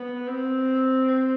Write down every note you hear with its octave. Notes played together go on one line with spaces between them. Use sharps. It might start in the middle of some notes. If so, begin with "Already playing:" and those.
Already playing: B3
C4